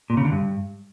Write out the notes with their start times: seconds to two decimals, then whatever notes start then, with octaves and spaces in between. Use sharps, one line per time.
0.10 A#2
0.17 C#3
0.25 D3
0.32 G2